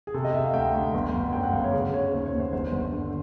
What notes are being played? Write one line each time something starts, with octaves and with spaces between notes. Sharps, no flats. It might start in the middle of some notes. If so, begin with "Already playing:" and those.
G#4
C3 A4
D#5
C3 E5
F5
D2 G5
D2
G1
G1
F#2 G5
F#5
G1 F5
C#5
C#3
C#3 C#5
D#2 C5
C#5
D#2
C5
G1 C5
G1
D3